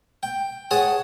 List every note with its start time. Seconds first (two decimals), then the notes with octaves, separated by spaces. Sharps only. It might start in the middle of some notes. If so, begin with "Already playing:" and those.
0.23 G5
0.71 G#4 C#5 F#5 G#5 A5